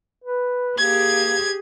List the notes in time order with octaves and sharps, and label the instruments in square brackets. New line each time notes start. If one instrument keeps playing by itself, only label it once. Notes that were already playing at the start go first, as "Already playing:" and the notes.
[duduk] B4
[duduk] A#3 [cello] G4 G#4 [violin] G#6